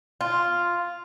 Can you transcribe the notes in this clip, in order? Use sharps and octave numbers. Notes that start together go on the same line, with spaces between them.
F4